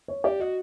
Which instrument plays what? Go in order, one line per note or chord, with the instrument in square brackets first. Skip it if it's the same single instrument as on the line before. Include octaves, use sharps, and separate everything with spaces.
[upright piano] C#5
[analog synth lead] G4 [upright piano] D5
[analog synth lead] F#4 [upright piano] D#5